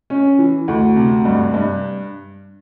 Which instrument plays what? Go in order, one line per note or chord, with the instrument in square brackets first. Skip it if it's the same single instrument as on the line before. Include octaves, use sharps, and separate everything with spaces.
[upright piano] C#4
E3
D2
C3
G2
G2